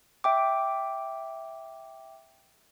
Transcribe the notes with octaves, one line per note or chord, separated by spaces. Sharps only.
E5 G5 D6